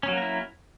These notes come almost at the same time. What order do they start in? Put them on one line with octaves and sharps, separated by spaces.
C#4 F#3 A#3 A#4 E4